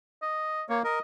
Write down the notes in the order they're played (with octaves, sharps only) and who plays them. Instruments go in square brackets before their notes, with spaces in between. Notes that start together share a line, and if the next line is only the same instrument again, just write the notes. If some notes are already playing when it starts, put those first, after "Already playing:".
[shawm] D#5
[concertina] A#3 [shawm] C#5
[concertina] A#4 [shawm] D#5